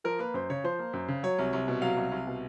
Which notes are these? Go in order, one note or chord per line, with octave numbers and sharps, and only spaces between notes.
F3 A#4
A#3 B4
F#2 C5
C#3 C#5
F3 C5
A#3
F#2
C#3
F#3 C#5
C2
C2
B2
F#3 F5
C2
C2
B2